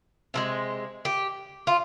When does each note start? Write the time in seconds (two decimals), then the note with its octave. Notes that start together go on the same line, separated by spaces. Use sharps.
0.34 C3 F3 G#3
1.05 G4
1.67 F4